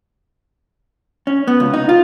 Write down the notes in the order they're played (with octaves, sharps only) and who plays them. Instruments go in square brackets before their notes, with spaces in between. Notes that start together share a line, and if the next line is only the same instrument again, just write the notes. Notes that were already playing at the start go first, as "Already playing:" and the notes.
[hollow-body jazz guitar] C#4
B3
C#2
D#4
F4